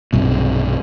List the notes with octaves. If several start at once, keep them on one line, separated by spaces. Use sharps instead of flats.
B1 G2 C3